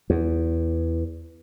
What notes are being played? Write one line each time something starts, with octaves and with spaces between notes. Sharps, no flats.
E2